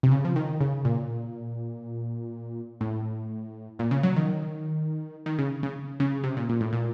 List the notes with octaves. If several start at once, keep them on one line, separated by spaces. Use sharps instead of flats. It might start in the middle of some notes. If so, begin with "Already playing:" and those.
C3
C#3
F3
D#3
C#3
A#2
A2
A#2
C#3
F#3
D#3
D#3
C#3
C#3
C#3
C3
A#2
A#2
A2
A#2